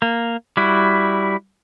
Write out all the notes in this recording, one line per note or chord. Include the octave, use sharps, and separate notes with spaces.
A#3
G3 E4 F#4